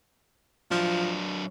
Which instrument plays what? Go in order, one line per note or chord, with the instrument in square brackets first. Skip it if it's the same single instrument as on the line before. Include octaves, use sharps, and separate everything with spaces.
[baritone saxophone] F3 [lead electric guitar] F#3 D4